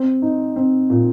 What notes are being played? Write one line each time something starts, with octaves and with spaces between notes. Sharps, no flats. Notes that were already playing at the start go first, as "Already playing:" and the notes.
Already playing: C4
D#4
C4
A#2